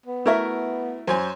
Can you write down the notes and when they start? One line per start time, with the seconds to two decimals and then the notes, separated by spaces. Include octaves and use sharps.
0.06 B3
0.26 A3 E4 F#4 A#4 E5
1.07 F#2 C5 C#5 G#5